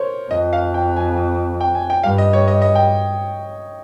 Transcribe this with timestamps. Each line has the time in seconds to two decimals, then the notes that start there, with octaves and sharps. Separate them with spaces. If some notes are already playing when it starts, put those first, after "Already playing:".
Already playing: A#4 C5 C#5
0.31 F2 D#5
0.53 F5
0.74 G5
0.97 G#5
1.61 G5
1.75 G#5
1.90 G5
2.03 G2 F5
2.18 D#5
2.33 C#5
2.48 D#5
2.62 D#5
2.75 G5